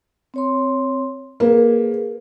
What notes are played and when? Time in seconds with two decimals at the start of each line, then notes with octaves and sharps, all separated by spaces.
0.34 C4 C#5 C6
1.40 A#3 G#4 A#4 B4